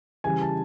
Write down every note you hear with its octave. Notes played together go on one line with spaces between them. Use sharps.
C#3 E3 G3 G#5
A5